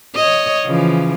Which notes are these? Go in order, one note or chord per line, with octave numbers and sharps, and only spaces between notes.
C#5 D#5
C#3 E3 F3